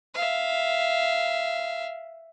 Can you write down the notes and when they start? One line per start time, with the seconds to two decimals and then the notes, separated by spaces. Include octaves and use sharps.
0.14 E5 F5